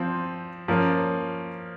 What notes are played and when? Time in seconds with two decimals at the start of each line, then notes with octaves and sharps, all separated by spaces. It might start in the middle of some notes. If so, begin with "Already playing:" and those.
Already playing: F3 C4
0.68 F3 A#3 C#4